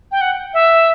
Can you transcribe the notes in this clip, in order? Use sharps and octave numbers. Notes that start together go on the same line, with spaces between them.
G5
F#5
E5